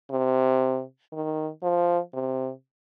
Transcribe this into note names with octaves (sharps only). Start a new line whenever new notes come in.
C3
D#3
F3
C3